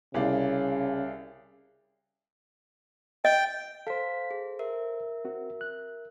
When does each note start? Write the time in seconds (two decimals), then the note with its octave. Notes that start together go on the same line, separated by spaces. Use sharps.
0.14 C2 C#3 D5 F5
3.25 D#5 G5
3.87 A4 C5 F5 B6
4.31 G#4
4.59 A#4 E5
5.25 C4 F#4
5.61 F#6